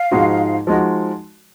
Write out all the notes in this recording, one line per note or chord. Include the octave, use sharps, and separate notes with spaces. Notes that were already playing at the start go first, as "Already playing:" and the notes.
Already playing: F5
G#2 F3 G#3 D#4 F#4
F3 G#3 D#4 F#4 D#5